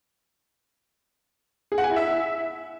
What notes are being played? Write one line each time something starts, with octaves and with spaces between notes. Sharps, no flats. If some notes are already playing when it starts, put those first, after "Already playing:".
G#4
F#5
G#5
E4
E5